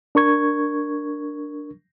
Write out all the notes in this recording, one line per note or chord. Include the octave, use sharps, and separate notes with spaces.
D4 A#4 C#6 G#6